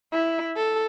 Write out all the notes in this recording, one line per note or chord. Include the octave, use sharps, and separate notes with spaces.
E4
A4